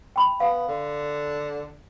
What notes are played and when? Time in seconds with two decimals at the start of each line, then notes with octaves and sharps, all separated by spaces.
0.16 G5 B5
0.40 B3 F5
0.68 D3